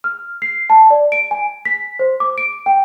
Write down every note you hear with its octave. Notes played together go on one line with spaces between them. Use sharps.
F6
C7
A5
D5
D7
G#5
B6
C5
D6
D7
G5